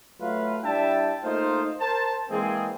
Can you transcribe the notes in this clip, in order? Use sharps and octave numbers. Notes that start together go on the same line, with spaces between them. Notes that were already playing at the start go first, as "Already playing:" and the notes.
F#3 A3 F4 B4 F5
G3 D4 E4 E5 G5 A5
A3 A#3 D#4 F4 C5
A#4 C5 A5
E3 G#3 A#3 C4 G#4